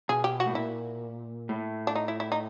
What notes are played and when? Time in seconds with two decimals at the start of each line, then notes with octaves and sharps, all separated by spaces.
0.09 B2 G#4
0.24 G4
0.40 F#4
0.46 A2
0.55 A#2 E4
1.49 A2
1.87 D4
1.96 D#4
2.08 E4
2.20 E4
2.32 D#4